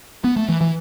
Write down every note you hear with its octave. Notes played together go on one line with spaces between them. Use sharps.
B3
A3
E3
E3